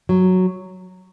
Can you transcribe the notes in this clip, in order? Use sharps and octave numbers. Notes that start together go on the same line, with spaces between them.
F#3